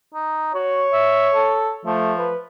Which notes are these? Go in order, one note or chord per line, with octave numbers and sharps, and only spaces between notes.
D#4
F#4 C#5
E5
A4
F3 A3
B4